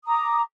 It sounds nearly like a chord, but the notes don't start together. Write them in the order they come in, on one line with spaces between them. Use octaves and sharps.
D#6 A#5 D6